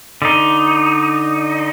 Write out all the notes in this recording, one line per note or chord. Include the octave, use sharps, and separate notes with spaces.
D3 D#4